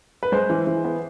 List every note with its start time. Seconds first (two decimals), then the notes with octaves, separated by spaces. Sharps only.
0.23 B4
0.32 G#3 C5
0.50 E3
0.67 E3
0.84 B3